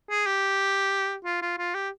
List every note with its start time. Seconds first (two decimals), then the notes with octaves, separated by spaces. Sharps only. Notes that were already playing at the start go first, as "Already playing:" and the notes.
0.10 G#4
0.27 G4
1.25 F4
1.42 F4
1.58 F4
1.75 G4